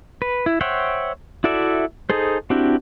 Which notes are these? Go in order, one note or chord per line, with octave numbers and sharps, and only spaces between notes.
B4
E4
C5 C#5 E5 F#5 G5
E4 F#4 A4 D5 E5
D#4 G#4 A4 C5
C4 D4 E4 F#4 G4